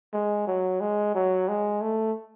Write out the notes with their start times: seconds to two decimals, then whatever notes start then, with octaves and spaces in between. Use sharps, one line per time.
0.13 G#3
0.47 F#3
0.81 G#3
1.15 F#3
1.48 G#3
1.81 A3